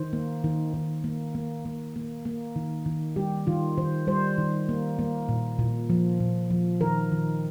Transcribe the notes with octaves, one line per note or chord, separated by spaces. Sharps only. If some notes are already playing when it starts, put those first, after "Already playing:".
Already playing: D#3 C5
A#3
D#3
D#3
A#3
A#3
A#3
A#3
A#3
D#3
D#3
G3 G4
D#3 F4
D#3 C5
G3 C5
D#3
A#3
A#3
A#2
A#2
F3
A#2
F3
D#3 A#4
D#3